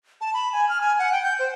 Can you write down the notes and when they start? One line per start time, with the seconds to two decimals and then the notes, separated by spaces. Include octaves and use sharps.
0.21 A5
0.34 B5
0.53 G#5
0.69 F6
0.81 G#5
0.99 F#5
1.12 G5
1.24 G6
1.39 C5